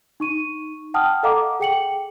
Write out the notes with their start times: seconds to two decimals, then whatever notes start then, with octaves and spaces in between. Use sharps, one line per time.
0.20 D#4 C#6 D#7
0.94 F#5 G5 A5 D#6 F6
1.23 A4 D#5 F5 F#5 A#5 D6
1.60 G#4 G5 C#7 F#7